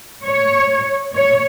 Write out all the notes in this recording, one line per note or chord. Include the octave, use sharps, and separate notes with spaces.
C#5
C#5